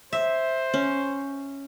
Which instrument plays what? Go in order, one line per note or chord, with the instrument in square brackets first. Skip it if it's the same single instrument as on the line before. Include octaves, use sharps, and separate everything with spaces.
[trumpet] C5 [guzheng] E5
[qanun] C#4